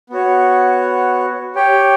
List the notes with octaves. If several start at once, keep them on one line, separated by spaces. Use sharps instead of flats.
B3 F#4 C#5
G4 C#5 G5